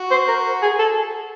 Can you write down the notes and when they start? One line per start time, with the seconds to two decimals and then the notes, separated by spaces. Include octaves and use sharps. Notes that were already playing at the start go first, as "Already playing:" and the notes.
Already playing: F#4
0.11 C5
0.28 A#4
0.62 G#4
0.79 A4